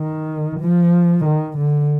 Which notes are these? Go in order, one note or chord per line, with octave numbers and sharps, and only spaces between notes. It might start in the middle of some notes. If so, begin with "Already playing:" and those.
Already playing: D#3
F3
D#3
D3